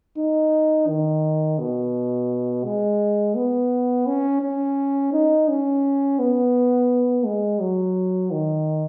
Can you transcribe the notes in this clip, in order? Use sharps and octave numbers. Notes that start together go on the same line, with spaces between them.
D#4
D#3
B2
G#3
B3
C#4
C#4
D#4
C#4
B3
G#3
F#3
D#3